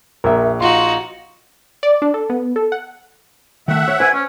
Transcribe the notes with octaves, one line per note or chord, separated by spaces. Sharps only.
A#1 A#4 E5
D#4 F4 F#4 C6
D5
D4
A4
B3
A4
F#5
D#3 A3 E5 F#5
C#5
B4 C5 D5 G#5
C#4